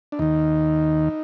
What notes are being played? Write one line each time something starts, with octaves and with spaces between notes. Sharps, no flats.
D4
D#2 D#3 D#4